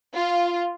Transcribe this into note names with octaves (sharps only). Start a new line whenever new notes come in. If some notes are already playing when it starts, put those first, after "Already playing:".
F4